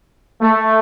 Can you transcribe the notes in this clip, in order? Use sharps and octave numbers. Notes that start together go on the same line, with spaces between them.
A3